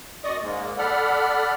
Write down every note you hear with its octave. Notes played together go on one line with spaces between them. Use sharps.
F#2 D5 D#5 C#6 D#6
G#2 G#3 A#3
A4 D5 F#5 B5 F6